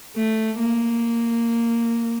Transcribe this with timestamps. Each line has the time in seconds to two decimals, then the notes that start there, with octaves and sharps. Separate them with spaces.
0.16 A3
0.59 A#3